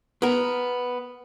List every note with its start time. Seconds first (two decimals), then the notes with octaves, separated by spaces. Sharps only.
0.22 B3 A#4